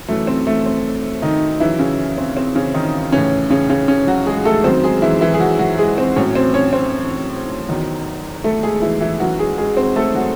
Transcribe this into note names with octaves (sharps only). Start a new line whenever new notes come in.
F#2 E3 A3
C4
A3
C4
D#3 D#4
F#2 C#3 E3 F#3 E4
C#3 C#4
C4
C4
C#3 C#4
D#3 D#4
A2 C#3 E3 C#4
C#3 C#4
C#3 C#4
C#3 C#4
F#3 F#4
G#3 G#4
A3 A4
F#2 D#3 F#3 C4 C5
G#3 G#4
E3 E4
E3 E4
G#4
F#3 F#4
F#3 F#4
G#3 G#4
C4 C5
A2 F#3 C#4 C#5
C4 C5
C#4 C#5
C4 C5
E2 D#3 F#3
A3 A4
G#3 G#4
E3 E4
E3 E4
F#2 E3 F#3 F#4
G#3 G#4
G#3 G#4
C4 C5
A3 A4
F#3 F#4